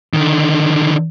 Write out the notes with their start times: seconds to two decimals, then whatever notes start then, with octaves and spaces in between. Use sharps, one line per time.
0.14 D3 D#3